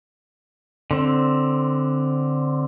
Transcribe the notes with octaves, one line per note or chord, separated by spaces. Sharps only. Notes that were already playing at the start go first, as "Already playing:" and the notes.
D3 C4